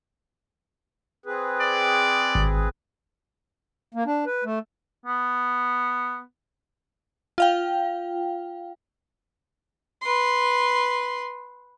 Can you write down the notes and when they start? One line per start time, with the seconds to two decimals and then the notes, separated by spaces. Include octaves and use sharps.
1.26 C4 G#4 B4
1.61 D5
2.35 G#1
3.94 A#3
4.06 D4
4.26 B4
4.44 A3
5.06 B3
7.38 F4 F5 G5
10.02 B4 C6